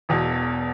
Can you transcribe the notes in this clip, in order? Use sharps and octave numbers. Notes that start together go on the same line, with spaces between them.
E1 E2 B2